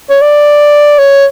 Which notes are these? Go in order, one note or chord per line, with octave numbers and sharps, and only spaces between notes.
C#5
D5
C#5